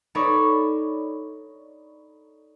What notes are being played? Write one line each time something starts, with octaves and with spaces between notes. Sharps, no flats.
D#4 A4 C#5 D5 B5 C#6